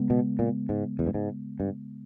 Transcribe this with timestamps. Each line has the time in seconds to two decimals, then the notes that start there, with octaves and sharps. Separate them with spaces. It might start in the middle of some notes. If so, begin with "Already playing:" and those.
Already playing: C#3 G#3 B3
0.10 B2
0.39 A#2
0.69 G#2
0.99 E2
1.07 G2
1.14 G#2
1.60 G2